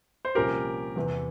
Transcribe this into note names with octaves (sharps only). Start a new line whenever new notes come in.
C5
C2 A#2 F3 A#3 C#4 G4 A#4
E2 C3 E3